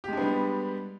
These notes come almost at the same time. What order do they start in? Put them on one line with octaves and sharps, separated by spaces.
G4 G#3 D4 B3 G3